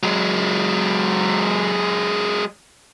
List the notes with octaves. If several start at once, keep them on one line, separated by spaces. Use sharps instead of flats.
F#3 G#3